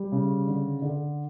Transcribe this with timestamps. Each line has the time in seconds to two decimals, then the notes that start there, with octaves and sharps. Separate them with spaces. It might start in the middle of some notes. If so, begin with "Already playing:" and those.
Already playing: G3
0.12 C#3
0.47 D3
0.82 D3